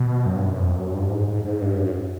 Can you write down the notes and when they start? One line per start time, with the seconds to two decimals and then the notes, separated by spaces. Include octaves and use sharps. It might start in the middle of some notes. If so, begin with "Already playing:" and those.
Already playing: B2
0.26 F#2
0.36 G2
0.46 F#2
0.60 F2
0.77 F#2
0.94 G2
1.10 G#2
1.28 G#2
1.44 G#2
1.61 G2
1.78 F#2